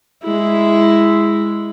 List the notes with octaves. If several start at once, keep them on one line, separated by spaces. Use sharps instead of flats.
G#3 E4